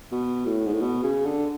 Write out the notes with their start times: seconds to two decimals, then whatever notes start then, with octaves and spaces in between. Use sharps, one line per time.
0.12 B2
0.46 A2
0.66 G#2
0.73 A2
0.81 B2
1.04 C#3
1.26 D3